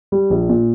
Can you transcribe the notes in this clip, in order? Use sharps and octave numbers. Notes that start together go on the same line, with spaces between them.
G3
A#1
A#2